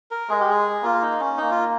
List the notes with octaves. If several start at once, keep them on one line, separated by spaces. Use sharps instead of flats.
A#4
G#3 G#4
G4
G#4
A#3 F4
D#4
C#4
A#3 D#4
F4